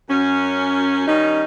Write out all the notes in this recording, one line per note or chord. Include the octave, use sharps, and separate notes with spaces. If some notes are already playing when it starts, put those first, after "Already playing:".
F#2 C#4
D#3 G3 C#4 D#4